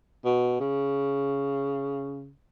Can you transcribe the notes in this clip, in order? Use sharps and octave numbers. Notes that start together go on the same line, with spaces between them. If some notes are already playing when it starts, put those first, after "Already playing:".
B2
C#3